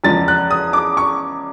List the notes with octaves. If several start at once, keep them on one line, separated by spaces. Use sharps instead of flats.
E2 C#3 F3 G#3 A6
F#6
D#6
D6
C#6